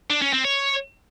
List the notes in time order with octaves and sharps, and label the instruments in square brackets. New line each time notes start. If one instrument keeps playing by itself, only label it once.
[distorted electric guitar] D4
C#4
C4
C#5